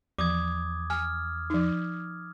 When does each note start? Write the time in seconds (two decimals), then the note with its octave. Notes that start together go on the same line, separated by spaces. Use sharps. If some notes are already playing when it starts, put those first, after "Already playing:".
0.18 E2 F3 D6 D#6 G#6
0.90 G#5 F6
1.50 F3 D#4